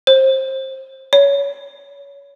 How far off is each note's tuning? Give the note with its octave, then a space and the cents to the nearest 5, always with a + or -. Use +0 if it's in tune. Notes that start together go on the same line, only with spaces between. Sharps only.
C5 +25
C#5 +20